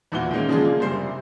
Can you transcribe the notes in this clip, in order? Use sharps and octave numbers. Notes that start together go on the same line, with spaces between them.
E2 A#2 E3 F#4 G7
D#3 G#3 A#3 C#4
C#3 F3 G#3 D4 F4 G#4
A#3
F#1 G3 C5 C7
C3